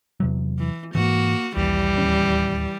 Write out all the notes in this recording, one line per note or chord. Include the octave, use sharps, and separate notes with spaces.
E2 C3 F#3
E3
G#2 E3 A#3 F#4
A#1 D#2 E3 G3
D1 D#2 C#4